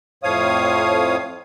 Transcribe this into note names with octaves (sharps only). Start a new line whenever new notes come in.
F2 A2 F3 C#5 F5 D#6